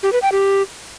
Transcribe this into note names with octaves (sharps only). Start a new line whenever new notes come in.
G4
B4
G5
G4